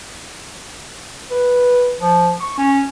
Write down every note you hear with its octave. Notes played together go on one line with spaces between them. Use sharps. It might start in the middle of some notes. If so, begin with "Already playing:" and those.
B4
F3
C#6
C#4